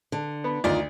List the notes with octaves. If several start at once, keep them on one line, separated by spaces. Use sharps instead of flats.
D3
B3
D2 D#3 F4 D5 D#5